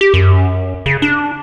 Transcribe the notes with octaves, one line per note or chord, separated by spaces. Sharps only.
G4
F#2
C#3
D4